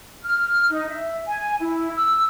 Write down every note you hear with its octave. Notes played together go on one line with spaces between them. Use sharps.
F6
D#4
E5
G#5
E4
E6